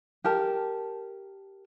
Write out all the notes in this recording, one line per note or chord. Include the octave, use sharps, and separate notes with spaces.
G4 A#4 A5